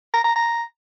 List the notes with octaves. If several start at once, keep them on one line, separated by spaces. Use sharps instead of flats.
A#5
A#5
A#5